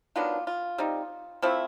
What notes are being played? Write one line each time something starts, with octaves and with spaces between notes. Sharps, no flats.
D#3 F#3 B3 D4 F4
F4
G3 C4 D#4
F3 A3 C4 E4